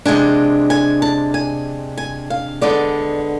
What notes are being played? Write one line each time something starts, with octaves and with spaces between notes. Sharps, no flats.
C3 G#3 D4 G#5
G#5
A5
G#5
G#5
F5
D3 G#3 B3 D5